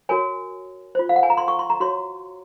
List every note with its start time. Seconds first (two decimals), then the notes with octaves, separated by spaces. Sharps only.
0.09 F#4 A#4 C#5 G#5
0.95 F4 C5
1.09 F5
1.16 F#5
1.23 G#5
1.30 A#5
1.37 C6
1.48 C#6
1.59 C6
1.70 A#5
1.80 F#4 C#5 C6